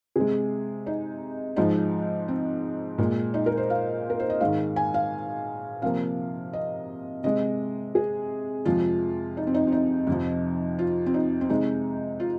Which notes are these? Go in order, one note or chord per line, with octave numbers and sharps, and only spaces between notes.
C3 G#3 G#4
D#4
G#2 F3 G#3 D#4
C4
A#2 G#3
D#4
A#4
C5
F5
A#4
C5
D#5
G#2 D#3 G#3 F5
G#5
F5
C3 F3 A#3 F5
D#5
C3 G#3 D#5
G#4
F2 C3 F3 G#3 F4
D#4
C4
D#4
C4
D#4
F2 C3 F3
F4
C4
D#4
C4
C3 G#3 D#4
F4